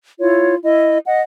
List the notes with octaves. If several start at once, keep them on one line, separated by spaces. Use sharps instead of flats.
E4 F4 C#5
E4 D#5
D#5 F#5